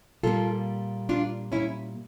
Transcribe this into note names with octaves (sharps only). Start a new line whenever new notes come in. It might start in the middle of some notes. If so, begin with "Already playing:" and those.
A#2 G3 A#3 F4 A4
D4 F4
C#4 E4